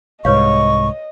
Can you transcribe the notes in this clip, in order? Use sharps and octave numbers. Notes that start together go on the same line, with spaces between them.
C2 G#2 B4 C#5 D#5 F5 C#6